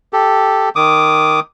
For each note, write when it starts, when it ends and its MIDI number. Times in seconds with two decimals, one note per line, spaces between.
0.13 0.69 67
0.13 0.69 69
0.76 1.40 51
0.76 1.40 86
0.76 1.40 87